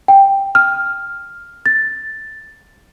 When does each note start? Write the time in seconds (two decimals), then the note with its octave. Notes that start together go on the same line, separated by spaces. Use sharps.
0.08 G5
0.55 F6
1.66 A6